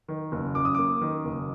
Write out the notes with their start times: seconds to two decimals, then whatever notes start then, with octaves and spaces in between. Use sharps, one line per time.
0.08 D#3
0.32 F#1
0.55 F#2 D6
0.65 D#6
0.74 A#3 D6
1.01 D#3
1.25 F#1